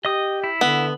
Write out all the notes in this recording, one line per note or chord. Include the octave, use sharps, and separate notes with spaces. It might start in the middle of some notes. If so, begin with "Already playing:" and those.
G4 D#5 D#6
E4
D3 B3